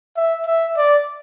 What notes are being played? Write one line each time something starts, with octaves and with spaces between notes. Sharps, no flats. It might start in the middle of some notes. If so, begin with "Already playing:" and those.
E5
E5
D5